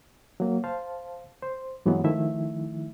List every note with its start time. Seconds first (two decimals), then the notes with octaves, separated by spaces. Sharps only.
0.40 F#3 A#3
0.64 C5 F5 A5
1.42 C5
1.86 G2 E3 F#3 G#3 B3
2.04 D#3 F3 A3 E4 E5